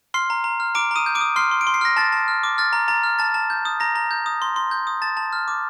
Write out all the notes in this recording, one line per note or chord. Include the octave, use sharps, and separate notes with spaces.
C6 F6 C7
A#5
A#5
F6
A#5 D6 D7
A#5 D#6 D#7
G6
D6 D7
D#6
C6 F6 C7
C6
D7
C6
C7
F6 A#6
A5 A6
A5
F6
D6
F6 A6
A#5
A#5 A6
F6
A5 A6
A5
G6
D#6
A#5 A#6
A#5
G6
D#6
C6
C6
G6
D#6
A5 A6
A5
F6
D6